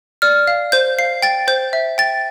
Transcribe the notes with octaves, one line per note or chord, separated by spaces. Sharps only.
D5 F6
F5
C5 G6
F5 C7
G5 A6
C5 G6
E5
G5 A6